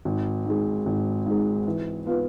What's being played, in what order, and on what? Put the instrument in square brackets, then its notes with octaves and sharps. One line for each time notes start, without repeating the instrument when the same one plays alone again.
[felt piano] G#1
G#2 G#3
G#1
G#2 G#3
E3
B3 F4 B4